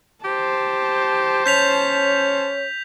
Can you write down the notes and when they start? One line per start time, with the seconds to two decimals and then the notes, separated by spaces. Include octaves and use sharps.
0.24 G4 C5 A5
1.46 C#4 C#5 G6 B6 F7